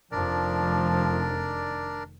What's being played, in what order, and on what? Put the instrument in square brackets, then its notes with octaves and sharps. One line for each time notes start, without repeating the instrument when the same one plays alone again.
[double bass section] F1 D#3 [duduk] F3 [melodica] D4 A#4 D5